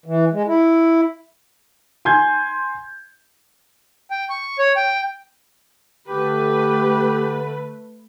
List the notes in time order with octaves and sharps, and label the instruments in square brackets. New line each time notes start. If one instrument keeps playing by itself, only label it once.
[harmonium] E3
G#3
E4
[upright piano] G#5 C6 G6 G#6
[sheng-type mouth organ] G5
C#6
C#5
G5
[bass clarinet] D3 [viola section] A3 B4 [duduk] G4